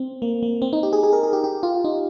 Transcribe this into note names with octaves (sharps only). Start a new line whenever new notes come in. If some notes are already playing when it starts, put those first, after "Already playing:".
Already playing: C4
A#3
A#3
C4
D#4
G4
G#4
G#4
A#4
G#4
G4
G4
F4
D#4